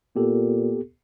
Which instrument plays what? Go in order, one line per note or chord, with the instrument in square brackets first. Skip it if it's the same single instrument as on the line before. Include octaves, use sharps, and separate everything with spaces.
[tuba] A#2 [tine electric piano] B3 G4 A4